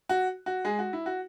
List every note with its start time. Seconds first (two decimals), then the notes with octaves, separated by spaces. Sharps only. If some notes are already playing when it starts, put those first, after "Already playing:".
0.09 F#4
0.46 F#4
0.65 G#3 G#4
0.79 F#4
0.93 E4
1.06 F#4